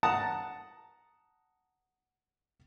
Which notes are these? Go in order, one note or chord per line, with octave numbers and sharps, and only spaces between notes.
F#5 A5 A#5 D#6